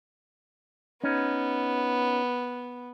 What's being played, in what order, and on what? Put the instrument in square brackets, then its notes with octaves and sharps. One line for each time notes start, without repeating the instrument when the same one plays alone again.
[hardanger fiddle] B3 [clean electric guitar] C#4 D#4